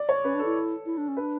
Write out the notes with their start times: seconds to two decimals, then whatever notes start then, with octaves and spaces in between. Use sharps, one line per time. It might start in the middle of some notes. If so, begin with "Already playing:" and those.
Already playing: D5
0.09 C#5
0.24 C#4 B4
0.34 D4
0.39 A4
0.45 E4
0.86 E4
0.98 D4
1.08 C#4
1.17 D4 B4